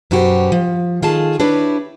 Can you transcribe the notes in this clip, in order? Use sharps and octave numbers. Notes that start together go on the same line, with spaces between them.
F#2 B2 C#4 F#4 G4 C5
F3
D#3 F4 G#4 A4 A5
D4 E4 G4 B4 C#5